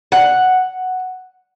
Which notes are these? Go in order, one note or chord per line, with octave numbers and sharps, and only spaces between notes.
F#5